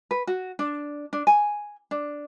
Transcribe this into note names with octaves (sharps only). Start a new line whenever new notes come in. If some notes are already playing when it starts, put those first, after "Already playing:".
B4
F#4
D4
D4
G#5
D4